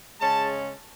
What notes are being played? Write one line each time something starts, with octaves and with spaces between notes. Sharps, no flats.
C#3 G#3 C#4 A5